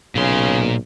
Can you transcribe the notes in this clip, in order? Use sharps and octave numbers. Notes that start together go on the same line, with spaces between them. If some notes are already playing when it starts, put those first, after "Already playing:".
B1 A#2 C#3 C6